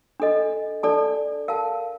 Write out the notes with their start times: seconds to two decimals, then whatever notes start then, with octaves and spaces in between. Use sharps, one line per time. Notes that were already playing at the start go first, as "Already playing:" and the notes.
0.20 D4 A4 D#5
0.83 D4 A4 D5 A5
1.48 A#4 F5 A5